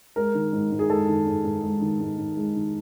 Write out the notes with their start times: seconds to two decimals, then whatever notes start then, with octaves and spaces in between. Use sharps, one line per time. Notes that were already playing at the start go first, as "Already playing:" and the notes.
0.16 G#3 A#4
0.35 D#3
0.53 G#2
0.72 G#2
0.79 G#4
0.90 G#3 A4
1.08 D#3
1.27 G#2
1.44 G#2
1.63 G#3
1.81 D#3
2.00 G#2
2.18 G#2
2.37 G#3
2.56 D#3